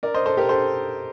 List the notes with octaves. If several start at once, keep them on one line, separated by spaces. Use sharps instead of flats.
A#4 D5
C5 D#5
A4 C5
G4 A#4
A4 C5